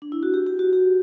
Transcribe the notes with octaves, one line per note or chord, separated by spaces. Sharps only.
D4
E4
F#4
G4
G4
F#4
G4